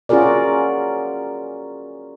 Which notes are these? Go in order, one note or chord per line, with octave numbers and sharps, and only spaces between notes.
C#4 F4 F#4 G#4 A#4 D5